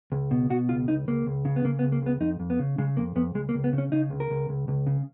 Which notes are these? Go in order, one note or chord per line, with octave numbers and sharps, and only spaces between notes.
C#2
B2
B2 F#4
C#2 F4
C#2 D#4
C#2 A#3
C#2
C#3
B3
C#3 A#3
B3
C#2
A#3
C#2 B3
F2 D#4
F2
B3
C#3
C#3 G#3
F2 A#3
F2 B3
C#2 G#3
A#3
C#2
B3
C#3
C#4
C#3 D#4
C#2
A#4
C#2
C#2
C#2
C#3